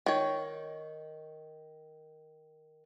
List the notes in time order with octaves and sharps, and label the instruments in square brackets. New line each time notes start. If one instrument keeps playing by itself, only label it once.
[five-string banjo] D#3 C#5